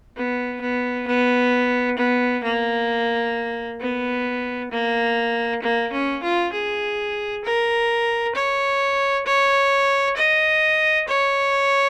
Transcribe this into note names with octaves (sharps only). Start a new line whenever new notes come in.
B3
B3
B3
B3
A#3
B3
A#3
A#3
C#4
F4
G#4
A#4
C#5
C#5
D#5
C#5